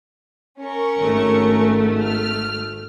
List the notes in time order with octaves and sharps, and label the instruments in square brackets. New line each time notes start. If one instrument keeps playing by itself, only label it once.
[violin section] C#4 A#4 C#6
[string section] G#1 A3
[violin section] F6